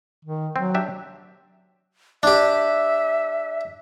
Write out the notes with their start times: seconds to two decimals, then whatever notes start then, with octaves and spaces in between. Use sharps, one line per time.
0.25 D#3
0.56 F#3 C4
0.74 D4 G4 E5
2.23 D4 G4 E5